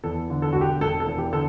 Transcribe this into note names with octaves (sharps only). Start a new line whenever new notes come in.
E2 A4
D3
A4
E1 F#4
G4
E1 A4
A4
E2
G4
D3 A4